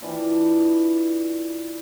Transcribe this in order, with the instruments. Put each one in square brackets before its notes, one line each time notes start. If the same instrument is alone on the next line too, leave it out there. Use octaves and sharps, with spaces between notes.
[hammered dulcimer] E3 D4 F4